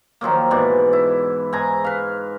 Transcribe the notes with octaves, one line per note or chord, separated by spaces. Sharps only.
D#3 F3 F#3 A#3
G#2 B2 E3 D5
E4
G#2 G#5 A#5
B4 F5